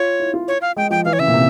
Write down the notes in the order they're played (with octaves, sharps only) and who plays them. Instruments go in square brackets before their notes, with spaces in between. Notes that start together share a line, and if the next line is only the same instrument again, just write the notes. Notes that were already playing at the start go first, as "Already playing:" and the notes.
Already playing: [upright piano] F4 [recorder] C#5
[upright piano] E4
F4
[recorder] C#5
F5
[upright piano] G#3 [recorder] G5
[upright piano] F3 [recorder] G5
[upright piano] E3 [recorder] F5
[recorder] C#5
[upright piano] C#3 [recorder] E5
[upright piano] A#2
C3